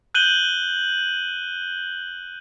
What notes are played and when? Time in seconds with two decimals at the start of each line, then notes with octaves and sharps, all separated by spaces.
0.14 F#6 G6 D#7 F#7 G7